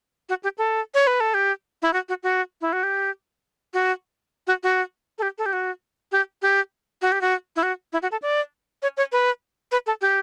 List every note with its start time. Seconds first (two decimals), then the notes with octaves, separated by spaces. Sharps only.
0.29 F#4
0.43 G4
0.58 A4
0.94 C#5
1.07 B4
1.20 A4
1.34 G4
1.82 E4
1.93 F#4
2.09 F#4
2.23 F#4
2.61 E4
2.73 F#4
2.83 G4
3.74 F#4
4.47 F#4
4.63 F#4
5.18 A4
5.22 G4
5.38 A4
5.46 G4
5.53 F#4
6.12 G4
6.42 G4
7.02 F#4
7.12 G4
7.21 F#4
7.56 E4
7.63 F#4
7.93 E4
8.02 F#4
8.12 A4
8.22 D5
8.83 C#5
8.97 C#5
9.12 B4
9.72 B4
9.87 A4
10.01 G4